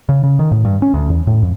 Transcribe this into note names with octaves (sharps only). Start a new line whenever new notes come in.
C#3
C#3
D#3
A2
G2
C#4
D2
E2
A2
F2